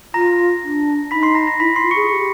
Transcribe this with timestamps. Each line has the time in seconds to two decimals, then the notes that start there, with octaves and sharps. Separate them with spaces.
0.14 F4 A#5 A#6
0.63 D4
1.10 D#4 B5 B6
1.23 C6 C7
1.35 A#5 A#6
1.47 A#5 A#6
1.60 E4 B5 B6
1.76 C6 C7
1.83 F4
1.91 G#4 C#6 C#7
2.08 G#4
2.13 G4